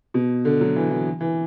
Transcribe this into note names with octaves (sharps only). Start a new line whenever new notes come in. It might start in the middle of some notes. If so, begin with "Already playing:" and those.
B2
D3
F#3
E3
E3
E3